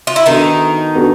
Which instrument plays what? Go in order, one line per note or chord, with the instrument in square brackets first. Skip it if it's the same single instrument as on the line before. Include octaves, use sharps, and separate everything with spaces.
[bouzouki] F4
E4
[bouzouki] D#3 D#4 [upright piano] B3 D4 F#4 A4
[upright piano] B3 D4 F#4 A4